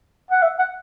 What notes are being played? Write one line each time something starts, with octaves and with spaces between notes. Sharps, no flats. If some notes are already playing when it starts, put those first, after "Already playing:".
F#5
E5
F#5